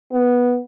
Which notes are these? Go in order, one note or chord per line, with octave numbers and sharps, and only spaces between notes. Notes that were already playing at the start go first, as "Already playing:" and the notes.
B3